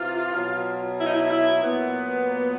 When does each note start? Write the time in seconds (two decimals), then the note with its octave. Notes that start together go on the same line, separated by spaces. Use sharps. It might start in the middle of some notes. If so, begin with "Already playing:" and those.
Already playing: C3 E3 F4
0.34 B2 F#3
0.98 E4
1.05 D#4
1.12 E4
1.30 E4
1.62 A#2 F#3 B3